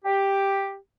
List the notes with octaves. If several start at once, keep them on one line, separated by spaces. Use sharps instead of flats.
G4